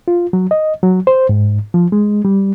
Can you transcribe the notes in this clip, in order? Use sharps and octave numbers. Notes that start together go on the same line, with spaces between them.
F4
F#3
D#5
F#3
C5
G#2
F3
G#3
G3